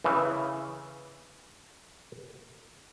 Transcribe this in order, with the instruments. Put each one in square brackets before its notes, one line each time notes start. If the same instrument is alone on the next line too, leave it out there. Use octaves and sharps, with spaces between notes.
[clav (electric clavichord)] C#3 E3